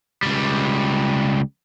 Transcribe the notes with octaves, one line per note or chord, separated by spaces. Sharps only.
C#2 G3